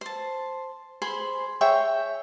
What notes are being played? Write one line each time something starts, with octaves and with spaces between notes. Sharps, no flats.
C5 A5
G#4 C5 B5 C6
G#4 C#5 E5 G5